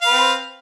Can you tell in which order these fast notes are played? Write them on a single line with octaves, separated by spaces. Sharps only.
F5 B4 C4